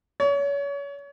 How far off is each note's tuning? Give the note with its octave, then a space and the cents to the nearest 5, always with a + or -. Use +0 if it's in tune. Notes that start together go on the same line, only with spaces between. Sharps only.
C#5 +30